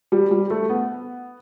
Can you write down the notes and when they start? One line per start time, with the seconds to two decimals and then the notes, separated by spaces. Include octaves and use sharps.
0.12 G3
0.31 G3
0.50 A3
0.70 B3